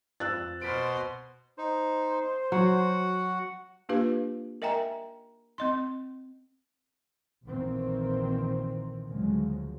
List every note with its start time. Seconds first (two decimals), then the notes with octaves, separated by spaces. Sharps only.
0.20 F2 E6 F#6 A6
0.61 B2 C5 C6 F6 B6 D7
1.58 D#4 C5
2.52 F#3 F#4 F#5
3.89 A#3 D4 F4 G4 B4 F5
4.62 A#4 D#5 E5 G5 G#5 A#5
5.58 C4 D#5 C6
7.44 A#1 A#2 D#3 E3 C4
9.07 D2 C#3 F3 F#3 G#3